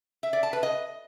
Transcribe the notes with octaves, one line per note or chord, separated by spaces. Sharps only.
E5
D5
A5
B4
D#5